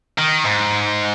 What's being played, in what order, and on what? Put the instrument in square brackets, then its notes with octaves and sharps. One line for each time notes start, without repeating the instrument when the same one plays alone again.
[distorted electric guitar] D#3
G#2